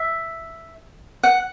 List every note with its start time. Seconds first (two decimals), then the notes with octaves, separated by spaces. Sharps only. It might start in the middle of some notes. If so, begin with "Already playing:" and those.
Already playing: E5
1.23 F#5